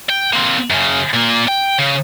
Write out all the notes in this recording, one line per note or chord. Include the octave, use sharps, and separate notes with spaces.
G5
A#3 C4
F#2 C#3
A#2 A#3
G5
C#3